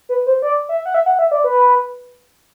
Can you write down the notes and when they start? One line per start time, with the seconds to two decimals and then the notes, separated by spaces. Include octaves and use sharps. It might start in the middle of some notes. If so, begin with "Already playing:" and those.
0.09 B4
0.27 C5
0.42 D5
0.69 E5
0.86 F#5
0.94 E5
1.06 F#5
1.19 E5
1.31 D5
1.44 B4